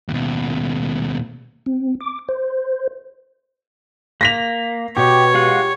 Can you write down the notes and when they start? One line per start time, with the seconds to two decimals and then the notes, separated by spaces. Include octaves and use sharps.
0.08 D#2 B2
1.66 C4
2.00 D6
2.29 C5
4.21 A#3 A#6 B6 F7
4.97 B2 G4 B4 C#5
5.34 G#3 F4 G4 F#5